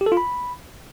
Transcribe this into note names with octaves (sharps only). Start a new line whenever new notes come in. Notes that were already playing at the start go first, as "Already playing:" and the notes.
G4
A4
F4
B5